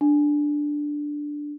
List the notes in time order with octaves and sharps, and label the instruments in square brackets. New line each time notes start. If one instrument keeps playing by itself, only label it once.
[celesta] D4